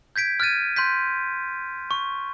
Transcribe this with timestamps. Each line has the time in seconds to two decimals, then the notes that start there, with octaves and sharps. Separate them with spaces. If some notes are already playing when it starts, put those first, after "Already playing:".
0.16 G6 G#6 B6 D7
0.40 F6 F#6 G#6 A6 D#7
0.76 C6 F#6 G6 B6
1.91 C#6